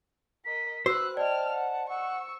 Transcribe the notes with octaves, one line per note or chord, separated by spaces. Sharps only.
A#4 D#5 B6
F#4 B4 C5 E6 F#6
D5 D#5 G5 A5 F6
F#5
F#5 C#6 E6